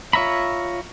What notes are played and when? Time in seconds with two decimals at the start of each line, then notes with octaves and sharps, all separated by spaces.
0.13 F4 C#5 E5 A#5 B5